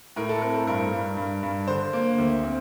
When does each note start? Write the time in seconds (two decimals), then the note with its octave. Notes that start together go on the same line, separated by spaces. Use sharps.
0.16 A2 A#4
0.29 A4
0.42 C4 A#4
0.54 A4
0.67 G2 A#4
0.92 G2
1.17 G2
1.43 G2
1.67 D3 C5
1.93 A#3
2.18 D2
2.44 C4